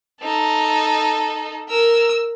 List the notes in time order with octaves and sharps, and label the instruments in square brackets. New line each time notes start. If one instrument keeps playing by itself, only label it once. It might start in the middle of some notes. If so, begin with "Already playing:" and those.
[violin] D#4 A4
A#4 E6